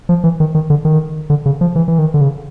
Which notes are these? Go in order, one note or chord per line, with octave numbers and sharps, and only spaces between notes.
F3
E3
D#3
D#3
D3
D#3
D3
C#3
F3
E3
E3
D#3
D3
C#3